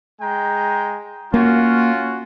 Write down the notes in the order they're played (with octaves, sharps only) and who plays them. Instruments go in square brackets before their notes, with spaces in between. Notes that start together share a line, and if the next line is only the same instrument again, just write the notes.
[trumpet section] G#3 G5 A#5
[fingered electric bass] A#3 [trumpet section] C#4 F4 F#4